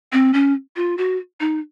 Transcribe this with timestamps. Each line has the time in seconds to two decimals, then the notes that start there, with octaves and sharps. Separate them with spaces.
0.12 C4
0.34 C#4
0.76 F4
0.98 F#4
1.40 D#4